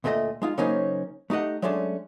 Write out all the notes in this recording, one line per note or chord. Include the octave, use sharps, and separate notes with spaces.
D2 A#2 A3 A4 D#5
G#3 D#4 F4
C#3 F#3 A#3 C#4 D#4 C5
A3 D#4 G4 D#5 F#5
F#3 G#3 A3 C#4 D4